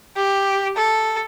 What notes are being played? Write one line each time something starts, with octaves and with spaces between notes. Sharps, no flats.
G4
A4